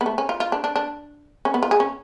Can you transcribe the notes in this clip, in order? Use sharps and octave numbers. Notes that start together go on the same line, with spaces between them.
B3
A3
C#4
F4
F4
D4
D4
D4
C#4
B3
F4
G#4
C#4